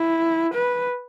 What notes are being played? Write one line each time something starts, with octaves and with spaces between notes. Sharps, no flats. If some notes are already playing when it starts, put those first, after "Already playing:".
Already playing: E4
B4